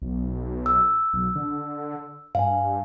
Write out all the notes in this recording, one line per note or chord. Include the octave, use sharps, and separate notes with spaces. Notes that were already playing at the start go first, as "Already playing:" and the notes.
B1
E6
B1
D3
G2 F5 G#5